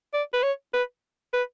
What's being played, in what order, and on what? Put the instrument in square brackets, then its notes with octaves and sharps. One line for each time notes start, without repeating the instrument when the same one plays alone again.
[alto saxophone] D5
B4
C#5
B4
B4